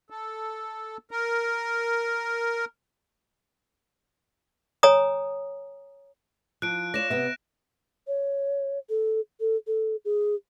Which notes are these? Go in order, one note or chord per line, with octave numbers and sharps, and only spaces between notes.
A4
A#4
C#5 G#5 A#5 D#6
F3 F#6 D7
F4 C#5 D5 A#6 E7
C3 B3 E5
C#5
A4
A4
A4
G#4